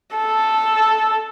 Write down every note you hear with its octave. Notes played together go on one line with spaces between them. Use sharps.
A4